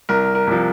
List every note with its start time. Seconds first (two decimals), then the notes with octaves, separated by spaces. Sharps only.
0.09 C2 A#4
0.35 A#4
0.47 C3 F3